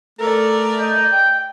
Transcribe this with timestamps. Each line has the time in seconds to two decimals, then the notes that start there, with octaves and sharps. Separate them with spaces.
0.19 A3 A4 A#4 D5
0.80 D#5 G6
1.12 G5